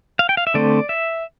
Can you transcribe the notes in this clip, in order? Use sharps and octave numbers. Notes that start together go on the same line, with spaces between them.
F5
G5
F5
E5
D3 A3 C4 D5
E5